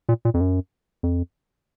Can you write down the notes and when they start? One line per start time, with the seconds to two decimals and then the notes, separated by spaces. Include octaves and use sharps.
0.09 A#2
0.25 A#2
0.34 F2
0.41 F#2
1.03 F2